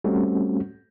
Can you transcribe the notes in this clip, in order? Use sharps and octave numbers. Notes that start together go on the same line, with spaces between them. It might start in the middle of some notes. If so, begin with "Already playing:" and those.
G3 A3 C4 C#4 F#4